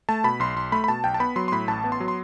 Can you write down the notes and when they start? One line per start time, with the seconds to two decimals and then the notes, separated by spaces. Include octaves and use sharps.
0.09 A3 A5
0.24 B2 B5
0.40 B1 C6
0.56 B1 C6
0.72 A3 B5
0.84 B5
0.88 B2 A5
1.04 B1 G5
1.14 A5
1.20 B3 B5
1.36 F#3 C6
1.48 C6
1.52 A2 B5
1.68 A1 A5
1.84 B3
1.92 C6
2.00 F#3
2.08 C6